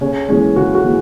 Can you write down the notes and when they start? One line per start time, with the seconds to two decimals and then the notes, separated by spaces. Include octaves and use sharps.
0.01 C#3 C#4
0.29 E3 G#3 C#4
0.56 C#3 F#4
0.75 F#4
0.85 E3